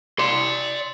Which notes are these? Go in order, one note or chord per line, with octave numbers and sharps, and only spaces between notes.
D5 C6